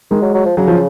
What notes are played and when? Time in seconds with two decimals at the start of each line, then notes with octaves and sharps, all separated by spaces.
0.11 D#3 G#3
0.22 F#3
0.34 F#3
0.45 F3
0.57 C#3 F#3
0.68 F3